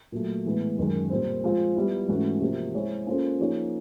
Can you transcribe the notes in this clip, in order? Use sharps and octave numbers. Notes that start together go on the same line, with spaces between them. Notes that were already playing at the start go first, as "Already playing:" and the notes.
A#2 F#3 A3
A2 E3 G#3 B3
F#2 D#3 G#3
A#2 G3 C4
F3 G#3 C4 F4
G3 B3 E4
G#2 E3 A3 C#4 F#4
C3 F3 A#3
G#3 C4 E4 G#4 C#5
A#3 C#4 F4 A4 C5
F3 A#3 D#4 G#4 C#5